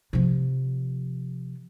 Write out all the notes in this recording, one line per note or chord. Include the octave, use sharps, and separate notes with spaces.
C3 F3